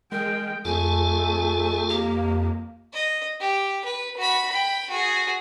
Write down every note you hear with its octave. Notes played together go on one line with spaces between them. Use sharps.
G#3 A#4 G5
F2 A3 F4 G#4 A4 G#5
A#3 G4
D#5
G4
B4
F#4 B5
G5 B5
F#4 G#4